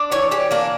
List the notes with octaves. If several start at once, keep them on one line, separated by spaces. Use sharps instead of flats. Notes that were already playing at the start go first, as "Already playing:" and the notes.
Already playing: D4
E3 C#5
E3 G4
A#3 D4